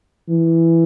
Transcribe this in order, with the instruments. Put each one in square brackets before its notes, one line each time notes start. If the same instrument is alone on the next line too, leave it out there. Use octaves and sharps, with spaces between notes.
[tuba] E3